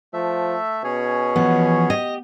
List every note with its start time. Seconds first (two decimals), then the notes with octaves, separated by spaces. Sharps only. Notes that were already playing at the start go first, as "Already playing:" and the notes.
0.13 F3 A3 E5
0.84 B2 C#4 G#4 C#5
1.36 E3 F3 B3
1.90 G4 D#5